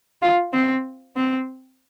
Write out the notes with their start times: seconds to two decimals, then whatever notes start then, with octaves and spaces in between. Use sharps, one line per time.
0.22 F4
0.53 C4
1.16 C4